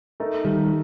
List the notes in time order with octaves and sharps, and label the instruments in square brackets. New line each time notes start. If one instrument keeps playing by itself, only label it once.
[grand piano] A3 D#4 A#4
[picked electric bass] D#3 G3